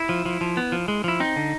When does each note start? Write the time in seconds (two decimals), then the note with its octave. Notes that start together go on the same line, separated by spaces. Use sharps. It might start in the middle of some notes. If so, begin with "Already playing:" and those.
Already playing: E4
0.09 F3
0.25 F3
0.41 F3
0.57 B3
0.72 F3
0.88 G#3
1.04 F3 E4
1.20 C4 D#4
1.36 D3